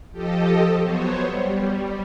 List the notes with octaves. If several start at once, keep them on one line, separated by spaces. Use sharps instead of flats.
F3 G4 A4 D#5
F#3 B3 C5 C#5
G3